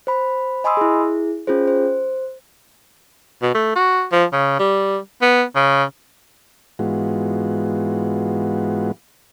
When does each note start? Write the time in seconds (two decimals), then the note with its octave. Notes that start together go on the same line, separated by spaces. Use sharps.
0.07 C5 B5
0.64 D#5 G#5 B5 C6 D#6 E6
0.77 E4 G#4
1.47 C#4 F4 G#4 C5
1.67 C5
3.42 B2
3.55 A3
3.76 F#4
4.12 F3
4.33 C#3
4.59 G3
5.22 B3
5.55 C#3
6.79 G#2 E3 G#3 B3 F4 F#4